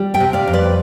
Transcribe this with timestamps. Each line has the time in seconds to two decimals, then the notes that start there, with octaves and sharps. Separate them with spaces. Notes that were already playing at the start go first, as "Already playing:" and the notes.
Already playing: G3
0.14 E5 G5
0.20 C3
0.33 D5 F5
0.47 F2
0.53 B4 D5